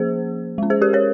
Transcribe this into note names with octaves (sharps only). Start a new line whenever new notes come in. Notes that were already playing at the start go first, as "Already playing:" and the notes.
Already playing: F3 A#3 C#4 G#4 C5
G#3 C#4
G#4 C5
G4 A#4
A#4 C#5